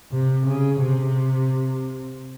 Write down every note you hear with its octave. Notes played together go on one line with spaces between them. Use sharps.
C3
C#3
C3